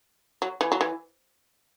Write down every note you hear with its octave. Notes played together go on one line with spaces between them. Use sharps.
F#3
E3
F#3
E3